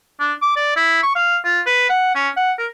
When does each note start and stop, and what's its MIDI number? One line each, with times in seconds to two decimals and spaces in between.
0.20 0.33 62
0.42 0.55 86
0.56 0.73 74
0.76 1.00 64
1.03 1.14 85
1.16 1.37 77
1.45 1.60 65
1.66 1.89 71
1.89 2.11 78
2.15 2.29 61
2.36 2.52 78
2.58 2.67 70